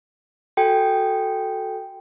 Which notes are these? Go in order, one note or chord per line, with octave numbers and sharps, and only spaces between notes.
F#4 A4 G5 G#5